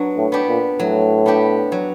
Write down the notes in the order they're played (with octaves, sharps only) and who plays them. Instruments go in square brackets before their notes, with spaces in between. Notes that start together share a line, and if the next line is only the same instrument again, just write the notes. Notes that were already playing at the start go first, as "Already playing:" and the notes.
Already playing: [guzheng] F#3 B3 D4
[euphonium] A2
[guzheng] B3 D4 G4
[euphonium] A#2
[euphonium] A2 [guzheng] F#3
[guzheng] B3 D4 G4
F#3